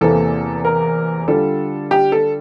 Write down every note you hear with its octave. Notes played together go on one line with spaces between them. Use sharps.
E2 C3 E3 A#3 A4
A#4
D3 G3 D4 F4 A4
G4
A4